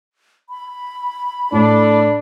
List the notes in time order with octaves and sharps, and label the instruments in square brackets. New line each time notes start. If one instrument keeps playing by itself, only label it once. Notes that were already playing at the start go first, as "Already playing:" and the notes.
[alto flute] B5
[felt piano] A2 [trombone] D4 [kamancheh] A4 D5